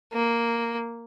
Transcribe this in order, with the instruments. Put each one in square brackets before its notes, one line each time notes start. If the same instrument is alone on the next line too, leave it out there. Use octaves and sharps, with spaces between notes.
[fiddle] A#3